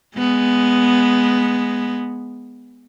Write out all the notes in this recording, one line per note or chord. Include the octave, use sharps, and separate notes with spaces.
G#3 B3